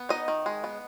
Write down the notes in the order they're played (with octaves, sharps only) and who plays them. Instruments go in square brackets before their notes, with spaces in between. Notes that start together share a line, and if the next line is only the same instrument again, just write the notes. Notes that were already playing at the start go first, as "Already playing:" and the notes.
Already playing: [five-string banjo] B3
D#4 D#5
D#3
G#3
B3